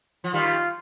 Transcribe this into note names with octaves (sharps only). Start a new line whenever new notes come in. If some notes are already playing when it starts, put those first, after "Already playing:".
F3
D#3 G3 F4